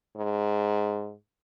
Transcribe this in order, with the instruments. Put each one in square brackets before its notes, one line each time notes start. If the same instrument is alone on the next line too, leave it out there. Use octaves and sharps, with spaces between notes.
[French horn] G#2